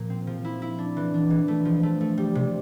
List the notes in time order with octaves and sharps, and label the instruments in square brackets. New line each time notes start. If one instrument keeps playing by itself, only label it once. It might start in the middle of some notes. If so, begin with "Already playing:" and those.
Already playing: [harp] A#2 F3 A#3
C4
F3
E4
E4
D4
E3
D4
E3
A3
F3
A3
A3
G3
C3